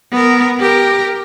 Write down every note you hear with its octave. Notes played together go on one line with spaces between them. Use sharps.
B3 A#4
G4 A#4